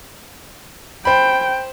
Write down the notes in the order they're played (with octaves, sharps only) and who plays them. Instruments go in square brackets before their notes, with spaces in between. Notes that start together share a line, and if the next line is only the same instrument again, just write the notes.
[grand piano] C5 B5 [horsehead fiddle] G5